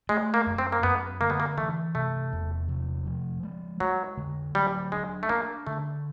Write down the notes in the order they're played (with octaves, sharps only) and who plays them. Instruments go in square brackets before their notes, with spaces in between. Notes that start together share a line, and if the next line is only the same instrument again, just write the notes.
[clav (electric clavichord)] G#3 [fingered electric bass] A3
[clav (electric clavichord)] A#3
[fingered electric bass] F#2
[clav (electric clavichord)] C4
A#3
[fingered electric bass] F#2 [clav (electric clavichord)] B3
[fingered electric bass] D3 [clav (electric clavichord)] A#3
[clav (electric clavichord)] B3
A#3
[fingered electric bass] E3 [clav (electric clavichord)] A3
[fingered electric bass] C3 [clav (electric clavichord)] A3
[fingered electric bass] E2
C3
F3
G#3
[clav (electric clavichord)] F#3 [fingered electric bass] G#3
[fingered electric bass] D3
[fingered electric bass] F#3 [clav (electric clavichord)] G3
[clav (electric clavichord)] G#3 [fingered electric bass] D4
[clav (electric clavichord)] A3
[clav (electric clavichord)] A#3 [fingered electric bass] D4
[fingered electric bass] D3 [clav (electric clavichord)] A3